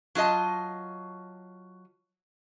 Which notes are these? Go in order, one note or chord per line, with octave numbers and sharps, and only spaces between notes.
F#3 F4 G#4 D#5 A5